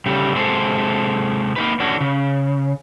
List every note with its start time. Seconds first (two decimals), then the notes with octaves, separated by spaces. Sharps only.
0.06 C#3 G3 A3
0.35 C3 G#3 A4 C5
1.56 A#3 D#4 B4
1.80 E3 A3 C#4 D4 F#4
2.01 C#3